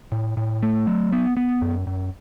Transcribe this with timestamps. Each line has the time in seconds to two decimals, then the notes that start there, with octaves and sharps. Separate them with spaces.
0.12 A2
0.37 A2
0.63 A3
0.87 F#3
1.12 B3
1.37 B3
1.62 F#2
1.87 F#2